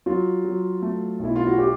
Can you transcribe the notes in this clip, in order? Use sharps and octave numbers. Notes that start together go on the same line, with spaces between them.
F#3 F4
F#3
A3
B1 E4
F4
F#4
F4 G4